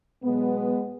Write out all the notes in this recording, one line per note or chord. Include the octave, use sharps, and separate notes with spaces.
B2 F#3 G#3 B3